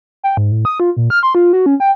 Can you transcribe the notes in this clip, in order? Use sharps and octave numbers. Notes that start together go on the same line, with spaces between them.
G5
G#2
A2
D#6
F4
A#2
F6
C6
F4
F#4
C#4
G5